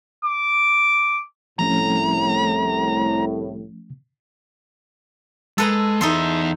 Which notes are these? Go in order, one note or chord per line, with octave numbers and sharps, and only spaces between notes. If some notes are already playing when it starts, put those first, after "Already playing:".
D6
C2 A2 F3 A3 C#4 A#5
G#3 A4 B4 A#5
E2 D#4 A4 E5 C6